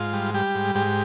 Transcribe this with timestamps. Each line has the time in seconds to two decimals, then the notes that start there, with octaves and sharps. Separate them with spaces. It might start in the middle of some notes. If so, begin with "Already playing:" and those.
Already playing: G#2 F4
0.13 G3
0.34 G3 G4
0.55 G#2
0.75 G#2 G4